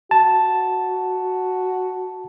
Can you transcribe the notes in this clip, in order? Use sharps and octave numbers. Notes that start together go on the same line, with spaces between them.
F#4 A5